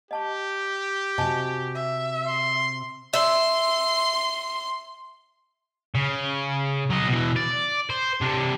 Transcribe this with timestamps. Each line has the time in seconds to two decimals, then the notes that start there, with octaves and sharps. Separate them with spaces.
0.11 G4 D#5 A5 C#6
1.18 C3 F#4 D#5 G#5 A5
1.75 E5
2.27 C6
3.14 E5 C6
5.95 C#3
6.90 F#3 D#5
7.08 B2 E3
7.36 D5
7.90 C5
8.21 C3 D4